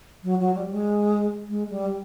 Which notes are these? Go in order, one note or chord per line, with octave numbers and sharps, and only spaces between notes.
F#3
F#3
G3
G#3
G#3
G3